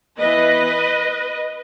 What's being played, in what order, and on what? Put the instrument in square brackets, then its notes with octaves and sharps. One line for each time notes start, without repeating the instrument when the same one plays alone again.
[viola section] E3 B3 B4 D#5